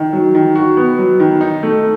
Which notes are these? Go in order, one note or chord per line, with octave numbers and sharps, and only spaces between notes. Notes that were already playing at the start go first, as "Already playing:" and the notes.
Already playing: D#3
F#3
D#3
F#4
B3
F#3
D#3
D#4
A3